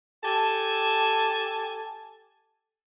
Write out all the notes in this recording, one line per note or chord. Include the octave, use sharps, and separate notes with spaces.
G4 A4 G#5 A5